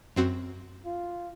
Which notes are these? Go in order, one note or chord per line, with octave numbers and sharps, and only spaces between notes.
F#2 C4 F#4
F4